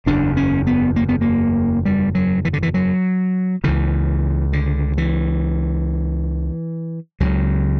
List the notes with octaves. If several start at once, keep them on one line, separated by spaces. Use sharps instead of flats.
F#1 E2 C#3 D4
C#4
B3
A#3
B3
A#3
G3
F#3
E3
D3
E3
F#3
C#2 C#3 E3
D3
E3
C#2 C#3 F#3